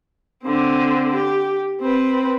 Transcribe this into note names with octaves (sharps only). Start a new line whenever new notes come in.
D3 C4
G4
C4 B4